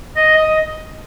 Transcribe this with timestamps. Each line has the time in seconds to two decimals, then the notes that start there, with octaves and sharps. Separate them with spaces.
0.16 D#5
0.36 D#5